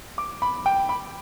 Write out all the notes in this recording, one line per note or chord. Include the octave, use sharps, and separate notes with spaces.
D6
B5
G5
B5